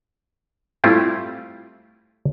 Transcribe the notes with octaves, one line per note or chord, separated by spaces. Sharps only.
G3 A3 C4 E4 F4 G4